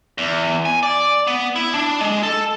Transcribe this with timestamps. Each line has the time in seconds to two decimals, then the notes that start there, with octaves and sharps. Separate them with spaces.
0.18 E2
0.65 G#5
0.83 D5
1.27 B3
1.56 E4
1.74 D4
2.01 G#3
2.23 A4